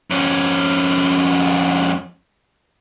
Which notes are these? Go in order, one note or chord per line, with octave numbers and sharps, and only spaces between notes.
F2 C#4